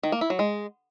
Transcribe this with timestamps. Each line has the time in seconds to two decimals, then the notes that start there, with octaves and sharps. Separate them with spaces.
0.03 D#3
0.12 A#3
0.21 E4
0.30 F#3
0.39 G#3